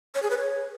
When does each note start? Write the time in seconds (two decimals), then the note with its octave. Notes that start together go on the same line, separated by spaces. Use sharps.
0.15 C#5
0.22 G#4
0.30 B4
0.38 C#5